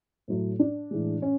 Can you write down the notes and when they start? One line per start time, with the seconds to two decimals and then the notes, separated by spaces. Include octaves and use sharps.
0.28 A2 F#3 A3
0.59 D4
0.91 A2 E3 G#3
1.22 C#4